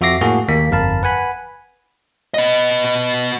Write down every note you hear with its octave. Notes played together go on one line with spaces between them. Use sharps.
F2 F#4 E5 D6 A#6 C7
A2 A#3 F#4 G#4
D#2 A#3 B6
G1 F2 A#4 F5 A5 B5
B4 F#5 G#5 B5
B3 D#5